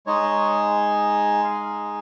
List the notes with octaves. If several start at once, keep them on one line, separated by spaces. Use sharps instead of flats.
G#3 D#4 G#4 C#5
F5